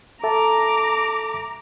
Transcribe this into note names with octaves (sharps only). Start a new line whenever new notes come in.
A4 E5 A5 A#5 D6